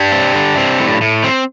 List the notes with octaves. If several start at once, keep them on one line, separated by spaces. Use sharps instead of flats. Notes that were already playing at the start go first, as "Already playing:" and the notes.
Already playing: D4 G4
C4
D3
C4
A2
A2
C4